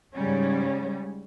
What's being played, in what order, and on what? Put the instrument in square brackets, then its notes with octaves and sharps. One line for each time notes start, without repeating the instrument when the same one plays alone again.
[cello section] G#2 C#3 G3 C#4